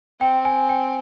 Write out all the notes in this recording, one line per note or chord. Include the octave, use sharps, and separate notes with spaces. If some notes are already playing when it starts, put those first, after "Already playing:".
C4 G5
G#5
G5